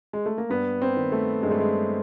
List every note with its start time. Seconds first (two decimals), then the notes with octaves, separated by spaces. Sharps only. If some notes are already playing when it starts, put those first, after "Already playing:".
0.13 G#3
0.26 A3
0.38 A#3
0.50 G2 B3
0.82 C4
0.96 D#3
1.12 A3
1.43 G2 G#3
1.51 A3
1.60 G#3